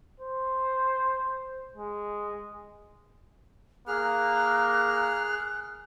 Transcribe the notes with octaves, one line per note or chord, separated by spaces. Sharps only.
C5
G#3
A#3 G#4 F6 F#6